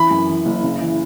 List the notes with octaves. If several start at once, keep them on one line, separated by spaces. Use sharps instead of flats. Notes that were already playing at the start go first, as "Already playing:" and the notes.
Already playing: E3 B5
F#2
E3
F#1
C#3
E3